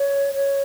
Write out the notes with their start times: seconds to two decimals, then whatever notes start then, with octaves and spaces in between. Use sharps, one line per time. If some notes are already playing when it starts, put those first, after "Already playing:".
Already playing: C#5
0.34 C#5